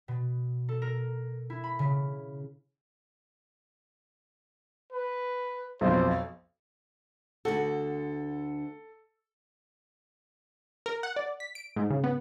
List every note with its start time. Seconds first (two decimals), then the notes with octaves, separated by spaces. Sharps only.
0.08 B2
0.69 A4
0.82 A#4
1.50 E4
1.64 B5
1.79 C#3
4.92 B4
5.81 B1 F2 C5
7.45 D2 D3 F#4 A4
10.86 A#4
11.03 F#5
11.16 D5
11.40 B6
11.55 D7
11.76 G#2
11.90 C#3
12.04 B3